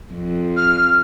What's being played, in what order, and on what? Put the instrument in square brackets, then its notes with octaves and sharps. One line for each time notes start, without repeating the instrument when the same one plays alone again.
[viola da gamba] F2
[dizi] F6